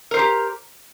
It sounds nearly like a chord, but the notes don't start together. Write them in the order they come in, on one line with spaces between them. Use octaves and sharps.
A#4 C5 A#5 G4